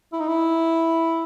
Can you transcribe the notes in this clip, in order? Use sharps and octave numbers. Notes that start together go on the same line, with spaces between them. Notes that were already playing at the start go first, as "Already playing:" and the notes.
E4
D#4
E4